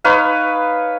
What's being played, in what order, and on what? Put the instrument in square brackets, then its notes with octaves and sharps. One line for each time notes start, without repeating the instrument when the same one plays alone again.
[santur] D#4 B4 C#5 F5